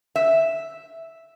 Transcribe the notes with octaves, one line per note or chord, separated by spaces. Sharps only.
E5